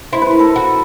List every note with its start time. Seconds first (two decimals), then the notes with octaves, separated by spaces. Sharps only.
0.13 E4 C5
0.22 B4
0.31 A#4
0.39 A4 B4
0.56 F#4